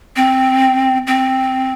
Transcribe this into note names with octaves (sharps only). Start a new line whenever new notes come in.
C4
C4